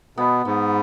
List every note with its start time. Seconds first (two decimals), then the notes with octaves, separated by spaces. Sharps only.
0.17 B2 B3
0.45 G#2 B3